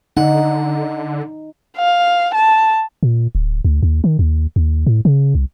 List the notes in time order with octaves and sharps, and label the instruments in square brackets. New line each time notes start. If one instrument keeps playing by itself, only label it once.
[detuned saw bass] D3 [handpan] D#4 [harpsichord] F#5
[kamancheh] F5
A5
[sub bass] A#2
D1
D2
D#2
D#3
D#2
D#2
A2
C#3
C2